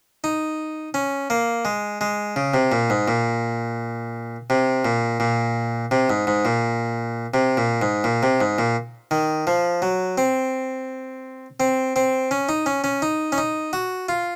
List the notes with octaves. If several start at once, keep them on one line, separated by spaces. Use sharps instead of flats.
D#4
C#4
A#3
G#3
G#3
C#3
C3
A#2
G#2
A#2
C3
A#2
A#2
C3
G#2
G#2
A#2
C3
A#2
G#2
A#2
C3
G#2
A#2
D#3
F3
F#3
C4
C4
C4
C#4
D#4
C#4
C#4
D#4
C#4
D#4
F#4
F4